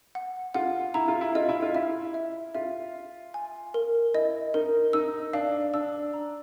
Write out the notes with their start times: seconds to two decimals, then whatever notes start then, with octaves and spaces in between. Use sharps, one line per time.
0.15 F#5
0.54 F4 F#5
0.94 E4 A#5
1.08 F4
1.21 E4
1.35 F4 D#5
1.49 E4
1.62 F4
1.75 E4 E5
2.14 E5
2.55 F4 E5
2.94 E5
3.34 G#5
3.74 A#4
4.14 E4 D#5
4.54 D#4 A#4
4.93 D#4 E6
5.33 D4 F5
5.73 D4 E6
6.13 A#5